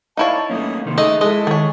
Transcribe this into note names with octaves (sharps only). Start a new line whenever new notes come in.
D#4 E4 C#5 D5 F5 A5
A3 A#3 C#4 D#6
C3 D#3 A#3 C6
A3 D#4 G#4 D#5 E5
G#3 E4 A4 D#5
D#3 G#4 C#5